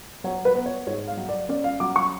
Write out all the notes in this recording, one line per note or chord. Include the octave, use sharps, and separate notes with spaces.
F#3 C#5
B4
B3
C#5
G#2 C#5
F5
F#3
D5
C#4 D5
F5
F#3 D6
C#6